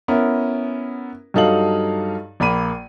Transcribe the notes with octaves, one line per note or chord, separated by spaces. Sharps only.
B3 C#4 E4 A#4
G2 F#3 D#4 A4 F5 F#7
A#1 A#3 B5 D#7